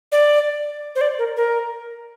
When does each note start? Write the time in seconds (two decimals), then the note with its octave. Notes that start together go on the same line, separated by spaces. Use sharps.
0.12 D5
0.95 C5
1.01 D5
1.19 A#4
1.36 A#4